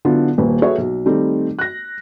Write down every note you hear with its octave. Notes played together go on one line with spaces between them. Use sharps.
D3 F#3 B3 E4 F4
D#1 D#2 B4
F#4 G#4 A4 B4 C#5 E5
B1
D#3 G3 A3 C4 D#4
F#6 A#6